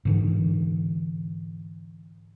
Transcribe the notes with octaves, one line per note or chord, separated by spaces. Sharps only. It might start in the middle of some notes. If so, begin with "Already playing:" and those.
G#2 D3 E3